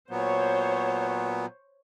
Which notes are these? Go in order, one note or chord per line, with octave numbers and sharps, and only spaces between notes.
A#2 F#3 B3 C5 C#5